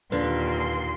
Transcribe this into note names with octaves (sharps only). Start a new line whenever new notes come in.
D#2 A#2 D3 B4 C6